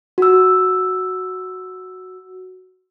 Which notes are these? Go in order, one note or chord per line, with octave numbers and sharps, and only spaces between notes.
F#4 E6